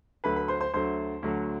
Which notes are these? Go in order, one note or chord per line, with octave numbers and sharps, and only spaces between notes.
D2 D3 F#3 A3 B4 B5
B4 B5
C5 C6
C5 C6
D2 D3 F#3 A3 C5 C6
D2 D3 F#3 A3